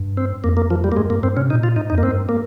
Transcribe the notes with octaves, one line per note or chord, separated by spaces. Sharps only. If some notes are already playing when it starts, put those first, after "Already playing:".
Already playing: G2
C4
F2 A#3
A#3
F3
G3
A#3
G2 G#3
G2 A#3
G2 C4
C3 C#4
A#2 D#4
F4
G#2 D#4
F2 D#4
A#3
G2 C4
A#3